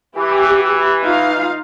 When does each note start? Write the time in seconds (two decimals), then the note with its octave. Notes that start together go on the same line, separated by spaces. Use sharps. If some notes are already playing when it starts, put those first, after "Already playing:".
0.16 E3 G4
1.01 D#4 F4 F5